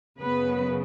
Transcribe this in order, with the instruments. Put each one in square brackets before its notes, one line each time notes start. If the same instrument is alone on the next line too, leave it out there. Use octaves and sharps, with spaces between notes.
[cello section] F#2 C#3 B3 B4